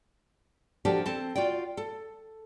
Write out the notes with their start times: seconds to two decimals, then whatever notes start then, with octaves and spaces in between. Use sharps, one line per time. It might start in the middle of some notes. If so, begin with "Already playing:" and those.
0.85 F3 D4 F#4 G4 A4 A#4
1.06 C4 A4 A5
1.36 F4 F#4 D5 G5
1.77 A4